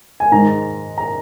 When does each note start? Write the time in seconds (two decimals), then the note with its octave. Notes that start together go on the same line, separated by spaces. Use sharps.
0.20 G#5
0.32 G#2 D#3 G#3 A#5
0.98 A#5